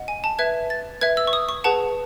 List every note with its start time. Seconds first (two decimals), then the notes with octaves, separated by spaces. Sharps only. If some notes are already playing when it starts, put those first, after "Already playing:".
Already playing: D#5 F#5
0.08 G#5
0.24 A5
0.39 B4 E5 G#6
0.70 A6
1.01 B4 E5 G#6
1.17 E6
1.27 C#6
1.33 D#6
1.49 C#6
1.64 G#4 B4 F#5 A5